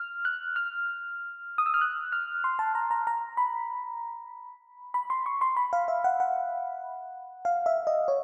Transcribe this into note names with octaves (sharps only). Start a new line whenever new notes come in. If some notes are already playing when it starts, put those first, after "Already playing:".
Already playing: F6
F#6
F6
D#6
E6
F6
F#6
F6
C6
A5
A#5
A#5
A#5
B5
B5
C6
C#6
C6
B5
F5
E5
F#5
F#5
F5
E5
D#5
C#5